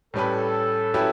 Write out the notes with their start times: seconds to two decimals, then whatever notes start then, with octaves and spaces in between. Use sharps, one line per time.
0.14 A2 G3 C#4 G4 A4 B4
0.94 F#3 C#4 E4 G4 B4